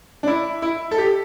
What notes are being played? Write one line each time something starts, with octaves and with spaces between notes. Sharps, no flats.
D4
E4
E4
A4
G4